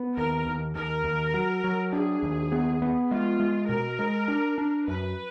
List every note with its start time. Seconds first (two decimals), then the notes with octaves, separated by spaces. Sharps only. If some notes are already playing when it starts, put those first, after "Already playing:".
Already playing: B3
0.17 D#2 A#4
0.47 D#2
0.75 D#2 A#4
1.04 D#2
1.34 F#3
1.64 F#3
1.93 D4 G#4
2.23 D#2
2.52 B3
2.82 B3
3.11 G#3 F4
3.40 G#3
3.69 B2 A#4
3.99 G#3
4.28 D4
4.58 D4
4.87 F#2 B4